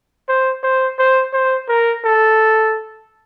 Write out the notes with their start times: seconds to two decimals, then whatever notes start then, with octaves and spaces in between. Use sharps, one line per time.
0.29 C5
0.63 C5
0.99 C5
1.33 C5
1.68 A#4
2.04 A4